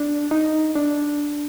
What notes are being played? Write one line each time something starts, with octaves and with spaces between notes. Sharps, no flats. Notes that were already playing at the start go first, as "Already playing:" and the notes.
Already playing: D4
D#4
D4